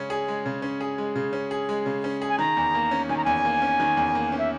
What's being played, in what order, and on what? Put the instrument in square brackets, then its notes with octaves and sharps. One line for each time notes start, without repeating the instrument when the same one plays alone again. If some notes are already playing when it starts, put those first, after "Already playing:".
Already playing: [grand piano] C#3 G#3 C#4
G#4
G#3
C#3
C#4
G#4
G#3
C#3
C#4
G#4
G#3
C#3
C#4
G#4
[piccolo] G#5
[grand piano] D#3 [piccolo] A#5
[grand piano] E2
A#3
C#4
[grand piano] D#3 [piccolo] G#5
[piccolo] A#5
[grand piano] E2 [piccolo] G#5
[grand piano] A#3
C#4
D#3
E2
A#3
C#4
[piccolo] E5